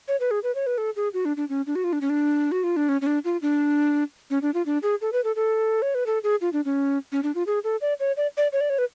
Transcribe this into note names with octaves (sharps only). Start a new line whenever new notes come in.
C#5
B4
G#4
B4
C#5
B4
A4
G#4
F#4
D4
D4
C#4
D4
F#4
F4
D4
C#4
D4
F#4
F4
D4
C#4
C#4
D4
F4
D4
C#4
D4
F4
D4
G#4
A4
B4
A4
A4
C#5
B4
A4
G#4
F4
D4
C#4
C#4
D4
F4
G#4
A4
D5
C#5
D5
D5
C#5
D5
C#5
B4